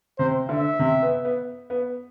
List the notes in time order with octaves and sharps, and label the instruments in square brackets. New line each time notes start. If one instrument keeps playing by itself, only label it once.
[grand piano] C3 [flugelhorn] C5
[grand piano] D3 [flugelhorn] E5
[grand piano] C3
B3
B3
B3